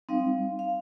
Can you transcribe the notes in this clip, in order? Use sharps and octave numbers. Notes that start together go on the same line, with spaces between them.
G3 C4 D#4 F5
F5